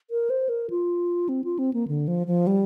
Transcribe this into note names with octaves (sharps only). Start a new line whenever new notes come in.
A#4
C5
A#4
F4
C4
F4
C4
A#3
D3
F3
F3
G3